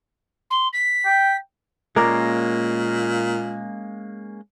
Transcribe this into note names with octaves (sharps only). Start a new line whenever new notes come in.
C6
B6
G5
A#2 G#3 A#3 C#4 A#4 D5